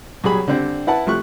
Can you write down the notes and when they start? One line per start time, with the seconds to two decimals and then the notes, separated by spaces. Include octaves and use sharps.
0.24 B1 F#3 G3 G#4 B5
0.48 D3 G3 C4
0.87 E4 B4 F#5 A5
1.06 C3 F3 A3 C#6 F#6